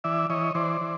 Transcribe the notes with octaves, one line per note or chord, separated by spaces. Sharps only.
E3 D5 E5
E3 C#5 D#5
E3 C5 D5
E3